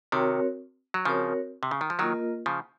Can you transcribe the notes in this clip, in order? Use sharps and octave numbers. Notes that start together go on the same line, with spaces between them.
C3 D#3 C4 F#4 A#4 C#5
F#3
C#3 F3 C4 F#4 A#4 C#5
C3
C#3
D#3
F3
D#3 F#3 A#3 F4 A#4 D#5
C#3 F3